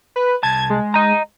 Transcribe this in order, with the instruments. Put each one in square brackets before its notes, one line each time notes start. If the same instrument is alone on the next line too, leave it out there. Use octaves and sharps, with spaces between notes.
[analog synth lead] B4
[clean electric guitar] C2 A5 [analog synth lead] G#6
[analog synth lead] G#3
[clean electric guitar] D#5 A#5